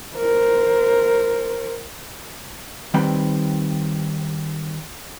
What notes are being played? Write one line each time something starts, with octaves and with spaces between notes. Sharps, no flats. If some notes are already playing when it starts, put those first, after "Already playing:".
A#4 C5
D#3 G3 C4 B4 G5 B5